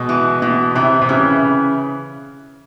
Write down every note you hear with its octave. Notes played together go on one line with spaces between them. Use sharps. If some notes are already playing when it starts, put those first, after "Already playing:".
Already playing: B2 G#3
E3
B2 E3
C3 E3
C3
C#3 E3